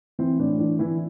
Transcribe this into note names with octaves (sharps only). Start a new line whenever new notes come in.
E3 C4
A2 D4
E3 D4
E3 E4